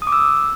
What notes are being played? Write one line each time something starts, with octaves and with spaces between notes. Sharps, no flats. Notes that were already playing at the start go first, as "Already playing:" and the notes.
D#6
D6
E6